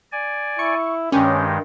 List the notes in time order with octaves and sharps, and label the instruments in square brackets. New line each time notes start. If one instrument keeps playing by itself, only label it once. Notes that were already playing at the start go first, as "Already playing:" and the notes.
[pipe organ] D5 G#5
[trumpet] E4 [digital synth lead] C#6
[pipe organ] G2 D#3 G#3 [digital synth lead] C#4 [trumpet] G4